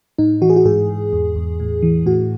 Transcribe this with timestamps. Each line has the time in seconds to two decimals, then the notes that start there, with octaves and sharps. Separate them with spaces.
0.18 A2 D#4
0.41 E3 F#4
0.50 G#4
0.56 F#4
0.65 G#2 G#4
0.89 G#2
1.13 E2
1.36 E2
1.60 A2
1.83 E3
2.06 A2 F#4